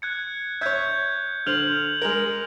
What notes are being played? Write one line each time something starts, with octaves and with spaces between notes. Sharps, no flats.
F#6 G#6 C#7
C#5 E5 G6 G#6
D3 C5 F6 F7 F#7
G#3 A#4